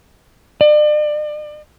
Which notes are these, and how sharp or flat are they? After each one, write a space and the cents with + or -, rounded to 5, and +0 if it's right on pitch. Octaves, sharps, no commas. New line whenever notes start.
D5 +40